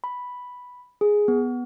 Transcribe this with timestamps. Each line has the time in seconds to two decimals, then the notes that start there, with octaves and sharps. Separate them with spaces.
0.04 B5
1.01 G#4
1.28 B3